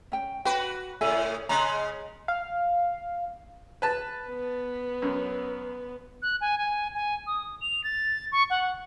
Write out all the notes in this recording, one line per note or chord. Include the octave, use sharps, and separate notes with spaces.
C#4 G5
F#4 B4 G5
A2 C#3 A4 E5 G#5
C#3 G#3 A#5
F5
B4 A5
B3
F#2
F#6
G#5
G#5
G#5
D#6
F7
A6
C#6
F#5